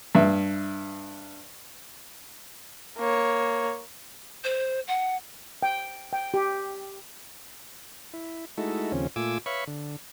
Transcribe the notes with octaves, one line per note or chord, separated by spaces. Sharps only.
G2 E5
A#3 C#5
C5
F#5
G5
G5
G4
E4
G#3 A3 D#4 E4 F#4 A4
D#2 C#3 F3 C4 C#4
A#2 A3 F4 G#5 D6 E6
B4 C#5 E5 F5 B5 C#6
D3